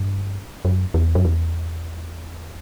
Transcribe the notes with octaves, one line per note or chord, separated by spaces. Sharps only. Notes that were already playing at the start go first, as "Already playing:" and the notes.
Already playing: G2
F#2
E2
F#2
E2